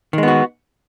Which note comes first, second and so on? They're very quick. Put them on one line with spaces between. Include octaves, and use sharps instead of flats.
D#3 G#3 B3 F#4